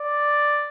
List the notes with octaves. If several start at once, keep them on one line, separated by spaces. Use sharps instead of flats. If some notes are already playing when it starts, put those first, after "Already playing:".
Already playing: D5